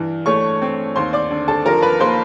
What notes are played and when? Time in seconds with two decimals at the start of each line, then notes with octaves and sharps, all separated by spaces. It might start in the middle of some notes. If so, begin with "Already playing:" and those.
Already playing: G2 E3
0.26 A3 C#5 C#6
0.62 C4
0.96 D#2 C5 C6
1.13 D5 D6
1.31 D3
1.48 A4 A5
1.66 F3 A#4 A#5
1.83 B4 B5
2.00 A#3 C5 C6